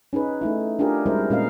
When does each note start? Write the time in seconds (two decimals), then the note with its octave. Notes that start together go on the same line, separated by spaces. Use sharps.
0.13 C#4 D#4 G#4 B4
0.41 A3 D#4 E4
0.79 D4 F4 G4 G#4 A#4
1.06 G3 G#3 C4 E4 A#4 C5
1.30 A#2 G#3 C#4 A#4 D#5 F5